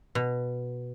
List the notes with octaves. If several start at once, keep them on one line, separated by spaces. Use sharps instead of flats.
B2